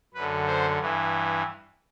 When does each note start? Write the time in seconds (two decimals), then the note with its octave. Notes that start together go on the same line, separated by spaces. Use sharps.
0.14 F#2 D3 B4
0.47 C5
0.79 G2 E3